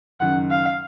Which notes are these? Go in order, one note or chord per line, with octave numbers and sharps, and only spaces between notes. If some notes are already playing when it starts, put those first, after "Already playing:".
F#1 F#2 D#3 F#5
F5